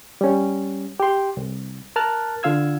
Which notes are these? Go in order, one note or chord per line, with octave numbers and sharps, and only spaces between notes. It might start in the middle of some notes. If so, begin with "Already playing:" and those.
G3 C#4
G4 C6
C2
A#4 A5 F6 F#6 A6
D3 F4 F5 E6 G#6